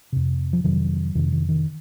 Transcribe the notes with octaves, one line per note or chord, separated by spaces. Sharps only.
F2 C3
F3
F2 C3 D#3 F#3
F2 C3 D#3
D#3
D#3